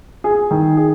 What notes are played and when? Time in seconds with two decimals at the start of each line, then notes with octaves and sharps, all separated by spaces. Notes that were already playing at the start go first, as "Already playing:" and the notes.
0.24 G#4
0.51 D#3
0.77 G#4